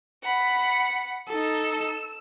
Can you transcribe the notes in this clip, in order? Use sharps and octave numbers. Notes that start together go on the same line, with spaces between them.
F#5 B5
D#4 A4 E6